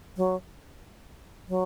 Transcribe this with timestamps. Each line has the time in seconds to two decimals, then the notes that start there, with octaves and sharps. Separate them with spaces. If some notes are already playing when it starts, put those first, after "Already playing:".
0.17 F#3
1.49 F#3